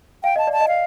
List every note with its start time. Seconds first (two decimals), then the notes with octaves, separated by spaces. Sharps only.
0.23 F5 G5
0.36 D#5 A5
0.47 D5
0.53 A5
0.60 D#5
0.68 F5